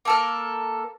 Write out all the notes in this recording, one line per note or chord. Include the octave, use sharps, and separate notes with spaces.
A#3 A4 A#4